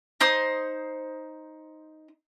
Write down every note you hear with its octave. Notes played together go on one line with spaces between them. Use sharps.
D#4 C5 D#6